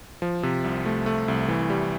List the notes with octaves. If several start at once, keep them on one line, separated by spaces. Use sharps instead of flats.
F3
C3
C2
A3
A3
C2
E3
G3